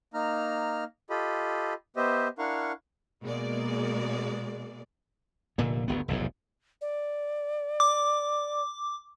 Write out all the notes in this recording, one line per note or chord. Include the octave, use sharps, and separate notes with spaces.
A#3 D#4 A#5 F6
F4 G4 A4 D#5 B5
B3 G4 C5 D#5 E5
D4 E4 A#4 F5 F#5 C#6
B2 G#3 A#3 D5
F1 A#2 D3
G1 D2 B3
F1 B1 E2 G#2
D5
D6